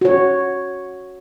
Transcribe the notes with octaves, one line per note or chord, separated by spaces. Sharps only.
F#4 C#5